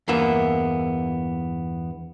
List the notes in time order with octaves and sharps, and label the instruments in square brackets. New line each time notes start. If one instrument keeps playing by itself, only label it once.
[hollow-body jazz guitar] E2 G2 A#3 B3 E5